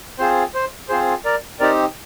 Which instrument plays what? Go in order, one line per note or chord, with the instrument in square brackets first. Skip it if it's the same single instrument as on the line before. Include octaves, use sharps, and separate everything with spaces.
[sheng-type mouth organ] C4 F4 G#4 C5
C5
C4 F4 G#4 C5
A#4 D5
C4 D#4 G4 A#4 D5